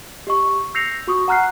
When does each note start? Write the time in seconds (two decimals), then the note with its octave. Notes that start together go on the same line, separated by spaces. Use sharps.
0.27 G4 D#5 C#6
0.74 E6 G6 A#6 C7 C#7 F7
1.08 F#4 C#6 D#6
1.28 F#5 A#5 F6 F#6 C7